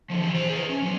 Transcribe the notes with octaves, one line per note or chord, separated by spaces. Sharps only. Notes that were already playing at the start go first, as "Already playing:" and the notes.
D3 F3
E3 G4
C5 A#5
G#4 B4
C#4
F#3 B3